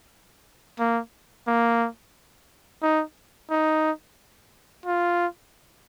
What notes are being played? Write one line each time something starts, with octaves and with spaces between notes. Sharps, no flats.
A#3
A#3
D#4
D#4
F4